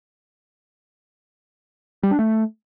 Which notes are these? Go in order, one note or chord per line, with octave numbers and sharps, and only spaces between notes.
G3
D4
A3